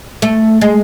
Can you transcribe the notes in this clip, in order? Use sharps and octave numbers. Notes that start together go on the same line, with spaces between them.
A3
G#3